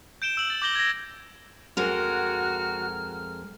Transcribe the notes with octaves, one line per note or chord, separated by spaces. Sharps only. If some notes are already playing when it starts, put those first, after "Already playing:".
G6 D7 E7 G7
E6 F#7
A6
D6 G6 A#6 F#7 G7
G#6 A#6
F2 G#3 F#4 A#4 F6